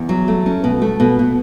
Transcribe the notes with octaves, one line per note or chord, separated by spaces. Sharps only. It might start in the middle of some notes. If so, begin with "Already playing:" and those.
Already playing: E2
F#3
A3
C#4
B2
A3
B2
B2